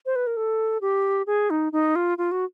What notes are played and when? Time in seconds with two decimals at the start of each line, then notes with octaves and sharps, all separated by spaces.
0.06 C5
0.16 B4
0.27 A#4
0.37 A4
0.81 G4
1.27 G#4
1.50 D#4
1.72 D#4
1.96 F4
2.18 F4
2.31 F#4